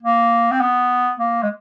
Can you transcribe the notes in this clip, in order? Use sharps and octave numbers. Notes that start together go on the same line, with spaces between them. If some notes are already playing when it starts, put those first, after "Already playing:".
A#3
C4
B3
A#3
G#3